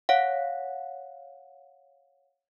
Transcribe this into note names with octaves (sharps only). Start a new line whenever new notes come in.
C#5 F5 F#5